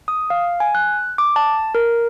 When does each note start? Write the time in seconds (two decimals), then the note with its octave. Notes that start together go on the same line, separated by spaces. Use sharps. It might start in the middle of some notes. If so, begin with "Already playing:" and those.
0.08 D#6
0.30 F5
0.60 G#5
0.75 F#6
1.18 D6
1.36 A5
1.75 A#4